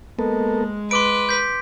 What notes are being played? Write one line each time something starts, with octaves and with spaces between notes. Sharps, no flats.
G#3 A#3 B3 A4
B4 B5 C6 D6 D7
G6 B6